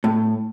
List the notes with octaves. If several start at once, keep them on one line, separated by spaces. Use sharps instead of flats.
A2